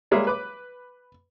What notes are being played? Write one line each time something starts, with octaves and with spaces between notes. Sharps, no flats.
G3 G#3 A#3 E5
B4 D6